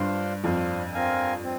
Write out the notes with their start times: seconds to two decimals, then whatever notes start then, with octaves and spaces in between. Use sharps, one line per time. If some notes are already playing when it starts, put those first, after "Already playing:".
Already playing: G2 D4 F4 C5
0.43 F2 D4 F4 C5
0.94 C4 F4 A#4 F5 G#5
1.44 C4